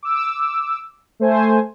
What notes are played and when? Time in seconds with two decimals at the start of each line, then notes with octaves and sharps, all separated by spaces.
0.03 D6 E6
1.20 A3 C5 G#5